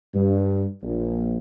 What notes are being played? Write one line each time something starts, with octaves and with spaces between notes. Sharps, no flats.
G2
A#1